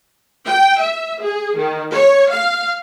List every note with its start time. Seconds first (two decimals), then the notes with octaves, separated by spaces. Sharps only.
0.47 G5
0.80 E5
1.23 G#4
1.57 D#3
1.92 C#5
2.30 F5